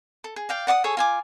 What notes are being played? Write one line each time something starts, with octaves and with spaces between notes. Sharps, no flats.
A4
G#4
D5 F5 G5
D5 F#5 D6 D#6
G#4 A4 C#5
F4 G#5 D6